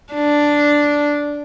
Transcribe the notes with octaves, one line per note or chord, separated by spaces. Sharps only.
D4